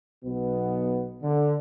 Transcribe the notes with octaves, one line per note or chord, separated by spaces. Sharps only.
B1 B2 B3
D3